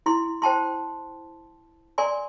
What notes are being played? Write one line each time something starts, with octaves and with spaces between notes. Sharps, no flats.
E4 C6
C5 G5 A5 C6
A#4 D5 G#5 C6